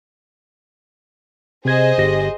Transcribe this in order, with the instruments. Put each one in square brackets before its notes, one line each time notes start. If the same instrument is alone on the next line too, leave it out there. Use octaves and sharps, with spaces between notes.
[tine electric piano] C3 G#6 [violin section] G#4 C5 D#5
[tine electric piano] G1 G4 A#6